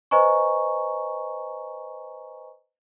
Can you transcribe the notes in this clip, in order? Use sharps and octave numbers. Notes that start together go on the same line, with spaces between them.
B4 C5 D#5 G#5 A#5 C#6